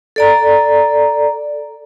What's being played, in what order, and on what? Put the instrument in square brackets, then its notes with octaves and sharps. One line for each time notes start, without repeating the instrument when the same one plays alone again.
[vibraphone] A4 D5 A#5